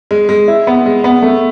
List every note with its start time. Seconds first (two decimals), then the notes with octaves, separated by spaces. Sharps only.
0.11 G#3
0.29 G#3
0.48 E4
0.67 B3
0.86 G#3
1.04 B3
1.22 A3